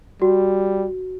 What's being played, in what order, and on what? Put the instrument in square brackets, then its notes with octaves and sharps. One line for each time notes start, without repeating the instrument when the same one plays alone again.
[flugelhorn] G3 [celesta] F#4